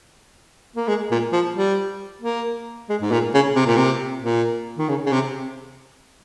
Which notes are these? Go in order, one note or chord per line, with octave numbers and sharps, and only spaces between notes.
A#3
G#3
A#2
F3
G3
A#3
G#3
G#2
A#2
C#3
C3
A#2
C3
A#2
D#3
C#3
C#3
C3